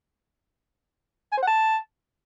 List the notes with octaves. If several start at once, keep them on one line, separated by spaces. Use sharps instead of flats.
G#5
C5
F#5
A5